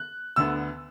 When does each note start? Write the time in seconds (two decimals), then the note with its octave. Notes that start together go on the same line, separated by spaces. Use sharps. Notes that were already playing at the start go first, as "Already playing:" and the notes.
Already playing: F#6
0.36 D2 D3 B3 E6